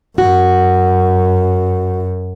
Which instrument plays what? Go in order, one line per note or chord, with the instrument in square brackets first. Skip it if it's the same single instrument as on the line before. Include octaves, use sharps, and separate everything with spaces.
[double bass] F#2 [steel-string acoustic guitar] F#4